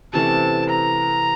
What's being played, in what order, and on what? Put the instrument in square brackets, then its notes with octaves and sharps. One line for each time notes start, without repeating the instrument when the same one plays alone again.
[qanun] C3 E3 A3 C#4 [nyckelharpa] A5
[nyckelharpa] A#5